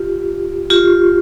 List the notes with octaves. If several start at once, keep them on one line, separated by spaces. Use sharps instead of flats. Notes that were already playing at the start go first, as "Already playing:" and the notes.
Already playing: F4 G4
F4 G4